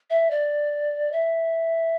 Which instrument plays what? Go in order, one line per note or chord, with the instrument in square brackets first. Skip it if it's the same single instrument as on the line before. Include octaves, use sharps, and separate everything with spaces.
[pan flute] E5
D5
E5